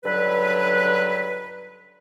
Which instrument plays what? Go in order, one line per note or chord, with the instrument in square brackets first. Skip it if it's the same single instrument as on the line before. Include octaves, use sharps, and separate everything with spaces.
[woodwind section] C#2 G2 D3 F#3 B4